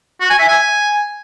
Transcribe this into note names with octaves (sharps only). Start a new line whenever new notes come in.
F#4
G#5
E5
G#5